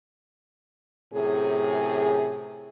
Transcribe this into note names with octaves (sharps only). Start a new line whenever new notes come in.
F#2 A2 C3 G#4